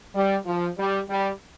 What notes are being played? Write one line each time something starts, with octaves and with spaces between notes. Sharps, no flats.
G3
F3
G3
G3